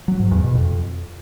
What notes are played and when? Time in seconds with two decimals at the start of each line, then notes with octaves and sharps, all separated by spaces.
0.08 F#3
0.20 G#2
0.31 E2
0.43 B2
0.55 F2